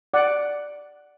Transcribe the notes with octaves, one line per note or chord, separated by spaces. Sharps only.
D5 F#5